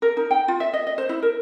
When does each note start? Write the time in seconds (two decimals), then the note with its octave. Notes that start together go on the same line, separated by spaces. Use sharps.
0.02 A#4
0.17 D#4
0.31 G5
0.48 F4
0.60 E5
0.73 D#5
0.87 D#5
0.98 C5
1.09 E4
1.22 A#4